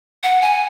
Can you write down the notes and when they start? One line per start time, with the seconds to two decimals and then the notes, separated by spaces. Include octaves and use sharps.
0.23 F#5
0.42 G#5